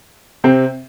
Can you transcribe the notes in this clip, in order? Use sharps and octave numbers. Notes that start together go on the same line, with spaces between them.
C3 C4